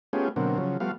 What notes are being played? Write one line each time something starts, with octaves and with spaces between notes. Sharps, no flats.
A3 B3 C#4 F4 G4 G#4
B2 D3 F#3 A#3 C4
C#3 F3 F#3
F3 G3 A3 B3 F#4 F5